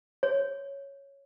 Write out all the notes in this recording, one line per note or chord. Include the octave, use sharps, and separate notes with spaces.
C#5